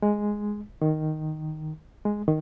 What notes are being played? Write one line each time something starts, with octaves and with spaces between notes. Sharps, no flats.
G#3
D#3
G#3
D#3